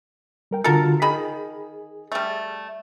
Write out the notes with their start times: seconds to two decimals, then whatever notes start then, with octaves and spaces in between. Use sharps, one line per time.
0.51 G3 A#4 G5
0.64 D3 F4 F#4 A4 A#4
1.02 D#3 G#4 B5
2.12 G3 A3